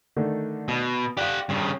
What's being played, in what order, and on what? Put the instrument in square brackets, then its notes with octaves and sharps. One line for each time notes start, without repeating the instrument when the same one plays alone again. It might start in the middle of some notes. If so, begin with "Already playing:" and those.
[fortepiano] D3 D#3 A3
[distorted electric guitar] B2
[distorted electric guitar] G4 F#5 [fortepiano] D5 F5
[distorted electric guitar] G2 C#3